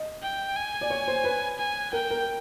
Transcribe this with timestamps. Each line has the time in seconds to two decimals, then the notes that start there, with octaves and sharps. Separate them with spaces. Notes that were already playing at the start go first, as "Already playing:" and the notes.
Already playing: D#5
0.22 G5
0.56 G#5
0.81 D5
0.90 C#5
1.08 C5
1.24 B4
1.58 G#5
1.93 A#4 G5
2.10 A#4